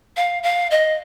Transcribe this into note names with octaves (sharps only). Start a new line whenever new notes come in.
F5
F5
D#5